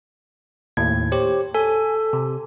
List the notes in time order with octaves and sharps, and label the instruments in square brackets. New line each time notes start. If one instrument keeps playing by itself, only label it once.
[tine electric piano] D#2 A2 G#6
G4 C5 C#5
[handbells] A4 [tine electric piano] G#5
[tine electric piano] C3